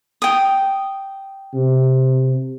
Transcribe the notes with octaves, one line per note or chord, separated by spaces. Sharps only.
G5 D#6
C3